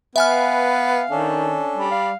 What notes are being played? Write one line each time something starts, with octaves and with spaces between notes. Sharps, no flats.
B3 B4 E5 G#5 F6
F5
D#3 C#4 D4 A4
G3
D5 F5